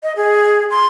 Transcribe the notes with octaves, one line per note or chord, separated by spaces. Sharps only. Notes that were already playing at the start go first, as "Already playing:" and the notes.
D#5
G#4
C6